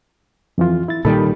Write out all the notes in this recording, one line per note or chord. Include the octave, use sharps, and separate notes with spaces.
F2 E3 F4
E4 A6
A#2 D#3 G3 A4 B5